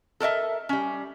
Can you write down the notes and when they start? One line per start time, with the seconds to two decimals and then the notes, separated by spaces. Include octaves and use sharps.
0.20 A4 A#4 D#5 E5
0.69 G3 C#4